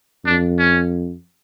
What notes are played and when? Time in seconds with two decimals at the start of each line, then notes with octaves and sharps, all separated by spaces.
0.25 F2 D4
0.58 C#4